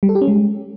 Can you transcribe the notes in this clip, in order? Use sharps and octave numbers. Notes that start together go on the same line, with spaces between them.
G3
A4
G4
C#4
G#3